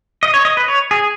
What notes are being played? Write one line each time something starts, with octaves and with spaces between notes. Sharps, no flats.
D#5
C#5
D#5
B4
C#5
G#4